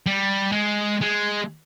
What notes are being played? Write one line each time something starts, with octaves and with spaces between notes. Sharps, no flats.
G3
G#3
G#3